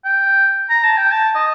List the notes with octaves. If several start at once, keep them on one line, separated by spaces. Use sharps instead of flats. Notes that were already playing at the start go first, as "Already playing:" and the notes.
G5
A#5
A5
G5
A5
D#5